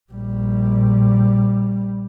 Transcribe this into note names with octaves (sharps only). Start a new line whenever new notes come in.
A#1 G3